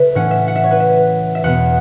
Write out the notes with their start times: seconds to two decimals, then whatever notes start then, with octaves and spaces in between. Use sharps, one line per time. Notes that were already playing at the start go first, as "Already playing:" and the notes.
Already playing: C#3 A4 B4 E5
0.15 A2 E3 C#4 F#5
0.31 E5
0.48 F#5
0.56 E5
0.64 C#5
0.71 B4
0.80 E5
1.35 E5
1.44 E2 B2 B3 F#5